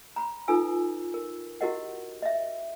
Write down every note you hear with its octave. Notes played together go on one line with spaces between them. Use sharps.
A#5 B5
D#4 F4 A4 B4 G#5 E6
A#4
E4 F#4 G4 A#4 D#5 F#5
D#5 E5